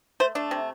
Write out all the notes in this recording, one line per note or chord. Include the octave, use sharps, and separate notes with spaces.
A3 C5
A3 D4
C3